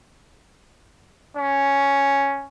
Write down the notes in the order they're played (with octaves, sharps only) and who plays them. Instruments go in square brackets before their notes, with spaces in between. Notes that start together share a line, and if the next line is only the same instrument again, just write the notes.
[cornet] C#4